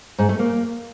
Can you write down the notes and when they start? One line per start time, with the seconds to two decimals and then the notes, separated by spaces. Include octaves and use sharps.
0.19 G#2
0.29 A3
0.39 A#3